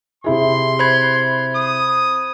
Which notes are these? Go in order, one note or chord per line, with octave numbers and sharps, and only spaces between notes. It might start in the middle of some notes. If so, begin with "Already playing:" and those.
C3 E4 G#4 C6
C5 B5 G#6
D#6